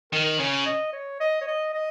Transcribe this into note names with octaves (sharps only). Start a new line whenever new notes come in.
D#3 A#4
C#3 C#5
D#5
C#5
D#5
C#5
D#5
D#5